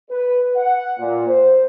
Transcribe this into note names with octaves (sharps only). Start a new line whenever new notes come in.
B4
F#5
A#2
C5